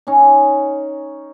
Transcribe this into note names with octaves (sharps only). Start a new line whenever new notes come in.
C#4 D#4